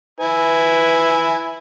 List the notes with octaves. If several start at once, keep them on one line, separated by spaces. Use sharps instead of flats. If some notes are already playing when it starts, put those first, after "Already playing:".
E4 B4 G#5